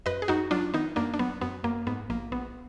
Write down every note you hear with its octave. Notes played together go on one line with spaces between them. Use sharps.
F#2 B4 D#5
G#4
F#2 D#4 F#4
F#3 D4 F4
D#3 B3 D#4
F#2 A#3 D4
D4
F#3 B3
F#2 B3
F#2 A#3
G#2 B3
A#1 A#3
A#1 B3